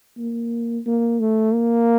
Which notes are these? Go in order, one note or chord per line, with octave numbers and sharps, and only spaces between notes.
A#3
A#3
A3
A#3